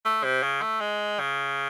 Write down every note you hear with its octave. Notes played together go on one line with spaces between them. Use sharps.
A3
C3
C#3
A3
G#3
C#3